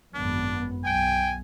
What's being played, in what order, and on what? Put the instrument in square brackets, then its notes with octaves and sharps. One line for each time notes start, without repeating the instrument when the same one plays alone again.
[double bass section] G#1 F#2 B3 [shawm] D4
[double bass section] B1 [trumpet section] G5 [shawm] G#5